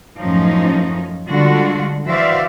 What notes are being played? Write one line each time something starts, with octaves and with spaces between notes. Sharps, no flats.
F#2 A2 F3 C#4 D#4
D3 G3 G#3 F4 F#4
E3 F#4 C5 D5 E5 F5